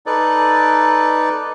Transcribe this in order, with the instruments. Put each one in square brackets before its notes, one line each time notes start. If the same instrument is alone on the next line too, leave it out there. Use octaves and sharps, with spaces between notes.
[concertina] D#4 A4 B4 D5